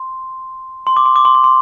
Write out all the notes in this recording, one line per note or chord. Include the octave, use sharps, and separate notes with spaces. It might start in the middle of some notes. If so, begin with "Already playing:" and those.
Already playing: C6
C6
D6
C6
D6
C6
D6
C6